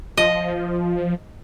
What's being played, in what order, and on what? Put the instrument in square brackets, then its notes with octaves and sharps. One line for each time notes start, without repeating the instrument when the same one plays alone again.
[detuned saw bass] F3 [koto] D#5